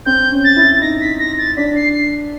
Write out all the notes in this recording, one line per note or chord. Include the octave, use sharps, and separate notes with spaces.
C4 G6
C#4
A6
E4
A6
D#4 A#6
B6
A#6
A6
D4 B6
C7
C7